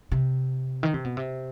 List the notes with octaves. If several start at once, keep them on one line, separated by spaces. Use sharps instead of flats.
C3
D#3
C3
B2
C3